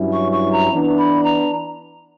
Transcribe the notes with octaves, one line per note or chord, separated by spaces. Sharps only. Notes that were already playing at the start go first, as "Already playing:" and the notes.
Already playing: G2 F#3 C#4 E4
C#6
C#6
A#5
E3 B3 D4
B5
A#5